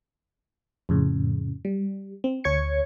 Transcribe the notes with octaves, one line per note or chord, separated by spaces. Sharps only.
F2 A2 C#3
G3
C4
D2 C#5 G#6 C#7